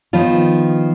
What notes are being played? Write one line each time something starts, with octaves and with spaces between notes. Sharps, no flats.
D#3 F3 B3 F4